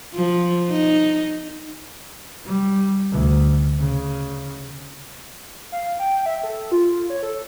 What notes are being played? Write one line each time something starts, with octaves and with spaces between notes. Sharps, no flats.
F3
D#4
G3
D2
C#3
F5
G5
E5
A4
F4
C#5
A4